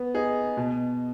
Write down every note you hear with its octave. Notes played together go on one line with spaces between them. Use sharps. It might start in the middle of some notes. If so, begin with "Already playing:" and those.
Already playing: B3
D#4 G#4
B2